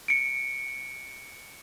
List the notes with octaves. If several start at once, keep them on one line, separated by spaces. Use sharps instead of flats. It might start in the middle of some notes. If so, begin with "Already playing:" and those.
C#7 D7